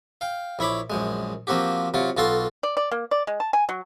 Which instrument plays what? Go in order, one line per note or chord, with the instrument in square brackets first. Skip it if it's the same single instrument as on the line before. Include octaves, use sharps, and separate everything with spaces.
[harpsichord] F5 G5
A#1 E4 C#5 B5 D6
A#1 F#2 G#3
F3 A#3 C4 F#4 G4
C3 F#3 F4
B1 F4 F#4 A4 C6
[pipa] D5
D5
A#3
D5
G#3
A5
G#5
F#3